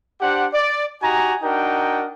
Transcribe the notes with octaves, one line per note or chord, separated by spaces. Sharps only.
D4 G4 C5 F#5
D5
D#4 F#4 G4 G#5 A#5
D4 D#4 F#4 A#4 G5